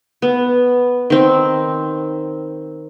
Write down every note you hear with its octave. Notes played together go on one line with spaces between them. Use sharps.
B3
D#3 C4